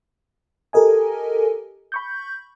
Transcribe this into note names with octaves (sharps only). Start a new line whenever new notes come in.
G4 A4 A#4 D#5 G#5
B5 C#6 G6